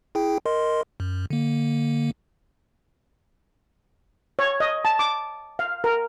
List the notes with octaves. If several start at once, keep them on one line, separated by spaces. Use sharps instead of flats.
E4 G#4 G5
A#4 D#5 C6
F#2
D3 A#3
C#5
D#5
A5
D6
F5
A#4